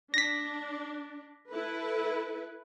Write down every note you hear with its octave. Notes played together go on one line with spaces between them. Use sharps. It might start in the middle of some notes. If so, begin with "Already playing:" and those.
D4 A#6 B6
E4 A4 B4